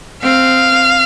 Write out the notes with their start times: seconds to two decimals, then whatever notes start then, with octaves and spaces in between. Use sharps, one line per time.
0.23 C4 F5